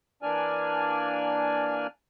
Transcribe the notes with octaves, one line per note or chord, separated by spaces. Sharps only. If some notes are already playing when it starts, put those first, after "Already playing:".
E3 A#3 D4 D5 G#5 F6